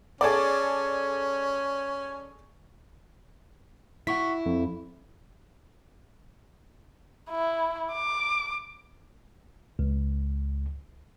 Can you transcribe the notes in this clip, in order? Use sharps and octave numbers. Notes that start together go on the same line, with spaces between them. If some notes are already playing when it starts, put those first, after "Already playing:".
C#4 G#4 A4 D5
E4 F#5 C#6 B6
F2
E4
D6
C#2